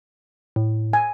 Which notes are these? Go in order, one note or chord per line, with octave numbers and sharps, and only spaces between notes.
A2
G#5